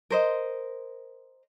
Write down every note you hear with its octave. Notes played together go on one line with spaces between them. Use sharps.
A#4 C5 D#5